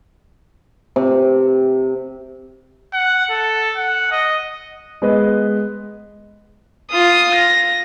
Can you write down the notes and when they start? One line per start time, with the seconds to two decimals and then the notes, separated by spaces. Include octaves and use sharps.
0.96 C3
2.94 F#5
3.31 A4
3.77 F#5
4.11 D#5
5.02 G#3 B3 B4 D#5
6.91 F4 D#6
7.35 A#6